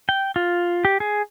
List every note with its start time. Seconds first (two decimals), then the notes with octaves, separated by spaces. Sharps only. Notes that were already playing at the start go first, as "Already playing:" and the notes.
0.09 G5
0.36 F4
0.85 G4
1.00 G#4